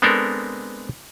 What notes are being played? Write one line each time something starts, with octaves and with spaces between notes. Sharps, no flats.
G#3 B3 C4 D4 A4 A#4